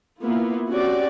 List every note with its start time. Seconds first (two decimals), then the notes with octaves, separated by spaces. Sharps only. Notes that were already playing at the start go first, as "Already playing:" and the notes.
0.22 A#3 B3 E4 F4
0.69 C4 C#4 F#4 G4 D5